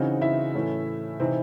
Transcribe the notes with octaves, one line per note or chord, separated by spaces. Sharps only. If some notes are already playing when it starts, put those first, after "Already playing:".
Already playing: C#3 E3 C4 D#4 F#4
E4 E5
A2 E3 A3 C#4
C3 E3 C4 D#4